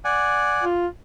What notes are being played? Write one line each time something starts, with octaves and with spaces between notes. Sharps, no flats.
D5 F#5 G#5
F4